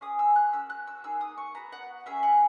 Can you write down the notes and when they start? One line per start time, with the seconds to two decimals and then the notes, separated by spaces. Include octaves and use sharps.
0.01 C#4 G#4 D#6
0.19 E6
0.36 F#6
0.53 C#4 F#4 E6
0.70 F#6
0.87 E6
1.03 A#3 D#4 G#4 E6
1.21 D#6
1.38 C#6
1.55 B3 F#4 A#5
1.72 F#5
2.06 C#4 G#4 E5
2.23 F#5